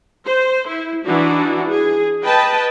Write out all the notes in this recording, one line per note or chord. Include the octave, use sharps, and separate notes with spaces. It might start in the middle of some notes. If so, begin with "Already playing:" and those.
C5
E4
E3 D4 D#4 F#4
G#4
B4 D#5 G5 A5